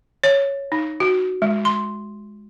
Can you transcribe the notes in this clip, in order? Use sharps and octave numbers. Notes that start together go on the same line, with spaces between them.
C#5
D#4
F#4
G#3
C6